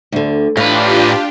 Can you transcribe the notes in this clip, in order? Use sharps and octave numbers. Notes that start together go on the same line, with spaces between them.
D2 D3
A2 D4 F4 G4 B4 F5